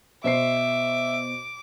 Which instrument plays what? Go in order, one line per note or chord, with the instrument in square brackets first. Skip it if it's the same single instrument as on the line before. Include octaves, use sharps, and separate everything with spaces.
[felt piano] B2 C5 C7 [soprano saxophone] E5 [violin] D6